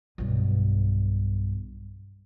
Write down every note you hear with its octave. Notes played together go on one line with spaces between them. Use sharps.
B1 G2